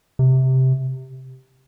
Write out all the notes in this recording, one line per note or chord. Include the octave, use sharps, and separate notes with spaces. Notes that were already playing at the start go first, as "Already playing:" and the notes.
C3